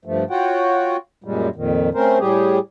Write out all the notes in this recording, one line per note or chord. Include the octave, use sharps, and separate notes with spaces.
G2 F3 A3
F4 F#4 C#5 F#5 G5
F#2 A#2 G3 G#3
F2 A#2 D#3
A3 C4 C#4 A#4 C5
A2 G3 G4 G#4